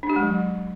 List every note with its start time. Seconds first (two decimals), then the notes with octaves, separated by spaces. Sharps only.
0.03 D4
0.10 G4
0.16 G#3
0.23 F#3